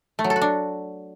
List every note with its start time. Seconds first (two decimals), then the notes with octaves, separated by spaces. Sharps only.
0.19 A3
0.24 F#3
0.30 A4
0.36 F#4
0.42 D4